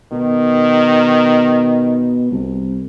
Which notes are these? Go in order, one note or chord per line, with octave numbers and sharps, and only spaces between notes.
B2 D#3
C2